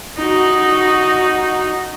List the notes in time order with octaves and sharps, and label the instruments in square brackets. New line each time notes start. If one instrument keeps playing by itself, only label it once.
[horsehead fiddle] D#4 F#4